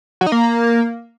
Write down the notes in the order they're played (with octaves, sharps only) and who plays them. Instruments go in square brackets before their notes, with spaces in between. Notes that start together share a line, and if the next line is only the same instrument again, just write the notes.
[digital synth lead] F#3
D#4
A#3